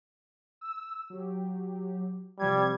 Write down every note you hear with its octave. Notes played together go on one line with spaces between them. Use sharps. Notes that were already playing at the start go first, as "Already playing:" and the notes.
E6
F#3 G4
C3 F3 G3 G#6